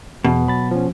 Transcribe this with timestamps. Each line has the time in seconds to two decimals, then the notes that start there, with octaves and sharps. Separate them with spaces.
0.24 E2 B2
0.47 F#3 B5 A6
0.71 F3 C#4